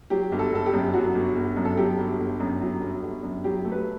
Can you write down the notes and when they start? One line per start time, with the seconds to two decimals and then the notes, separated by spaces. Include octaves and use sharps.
0.10 F#3 G4
0.32 G1
0.39 A4
0.52 G1 A4
0.66 G4
0.73 F#2
0.94 F#3 F#4
1.15 G1
1.35 G1
1.57 F#2
1.65 A4
1.77 F#3 G4
1.98 G1
2.19 G1
2.40 F#2
2.61 F#3
2.81 G1
3.02 G1
3.23 F#2
3.44 F#3 G4
3.65 A3
3.72 B4